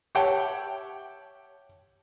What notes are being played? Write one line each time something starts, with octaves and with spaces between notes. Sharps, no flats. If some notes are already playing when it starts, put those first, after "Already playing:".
G4 C#5 E5 F#5 G5 A5